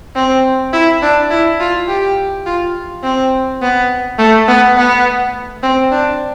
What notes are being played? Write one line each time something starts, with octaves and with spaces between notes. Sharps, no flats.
C4
E4
D4
E4
F4
G4
F4
C4
B3
A3
B3
B3
C4
D4